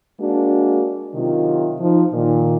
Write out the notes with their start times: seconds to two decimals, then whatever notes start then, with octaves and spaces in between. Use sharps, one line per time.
0.20 G#3 A#3 D4 F#4
1.15 C3 D#3 F#3 F4
1.80 F3 D#4
2.13 A#2 D#3